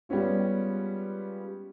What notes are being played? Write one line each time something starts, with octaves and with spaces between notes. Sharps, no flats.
G3 G#3 B3 C#4 F4